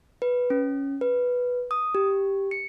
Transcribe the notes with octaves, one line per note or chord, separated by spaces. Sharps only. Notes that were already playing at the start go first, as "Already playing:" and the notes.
B4
C#4
B4
D#6
G4
C#7